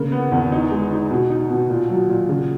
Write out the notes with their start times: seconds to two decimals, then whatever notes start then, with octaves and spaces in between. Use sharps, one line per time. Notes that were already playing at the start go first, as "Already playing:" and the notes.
Already playing: C#3 A#3
0.12 B3
0.32 E2
0.52 D#4
0.72 G#3
0.91 D#4
1.11 B2
1.30 D#4
1.51 B2
1.70 A#2
1.90 F#3
2.09 A#2
2.29 C#3